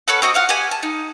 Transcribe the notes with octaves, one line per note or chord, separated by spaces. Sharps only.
C#4 A4 B4 F#5
C4 F#4 D#5
F4 F5 F#5
G4 F#5 G#5
A5
D#4